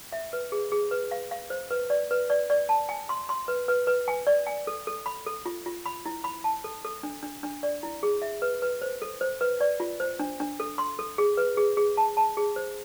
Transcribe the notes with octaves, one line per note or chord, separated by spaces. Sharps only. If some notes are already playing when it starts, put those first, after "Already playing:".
E5
B4
G#4
G#4
B4
F5
F5
C5
B4
D5
B4
D5
D5
A5
G#5
C6
C6
B4
B4
B4
G#5
D5
G#5
A4
A4
B5
A4
F4
F4
B5
E4
B5
A5
A4
A4
D4
D4
D4
D5
E4
G#4
E5
B4
B4
C5
A4
C5
B4
D5
F4
C5
D4
D4
A4
C6
A4
G#4
B4
G#4
G#4
A5
A5
G#4
C5